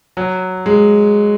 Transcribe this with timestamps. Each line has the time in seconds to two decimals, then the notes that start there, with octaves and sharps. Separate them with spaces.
0.17 F#3
0.66 G#3